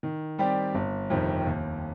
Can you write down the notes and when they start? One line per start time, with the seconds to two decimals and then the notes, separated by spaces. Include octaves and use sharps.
0.03 D#3
0.39 G3 C4 G4 D5
0.75 G1
1.10 F2 C3 D#3 G3
1.47 D#2